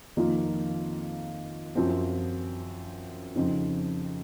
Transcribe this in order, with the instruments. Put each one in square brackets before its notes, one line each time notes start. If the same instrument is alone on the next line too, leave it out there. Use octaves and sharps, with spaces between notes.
[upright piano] F2 D#3 A#3 F4
F#2 F3 C4
F2 C#3 F3 C4 D#4